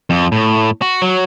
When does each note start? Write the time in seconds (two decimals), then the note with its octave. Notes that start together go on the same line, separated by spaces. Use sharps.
0.10 F2
0.32 A2
0.82 F#4
1.02 F#3